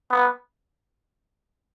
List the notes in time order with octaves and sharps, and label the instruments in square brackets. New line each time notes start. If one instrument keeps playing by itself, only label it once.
[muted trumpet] B3